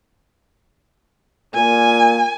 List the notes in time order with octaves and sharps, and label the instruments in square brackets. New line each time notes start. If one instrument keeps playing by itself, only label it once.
[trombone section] A#2 [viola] G#5